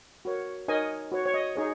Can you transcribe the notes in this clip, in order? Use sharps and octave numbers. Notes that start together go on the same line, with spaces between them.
F#4 A#4 C#5
D#4 A#4 C#5 D#5 G#5
F#4 C#5
C#5
D#5
D#4 G#4 C#5